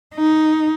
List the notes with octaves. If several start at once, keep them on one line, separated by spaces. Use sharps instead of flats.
D#4